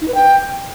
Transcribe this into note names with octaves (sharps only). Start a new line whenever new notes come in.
D#4
B4
G5